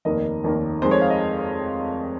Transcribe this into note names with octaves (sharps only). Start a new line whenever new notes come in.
F1 D#2 D#3 A#3 D#5
F1 D#2 D#3 A#3
F1 F2 D#3 G#3 C5
C#5
F5
D#5